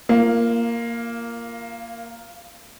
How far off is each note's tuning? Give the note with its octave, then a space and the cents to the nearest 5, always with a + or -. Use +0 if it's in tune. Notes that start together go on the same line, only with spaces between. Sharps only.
A#3 +0 F4 -25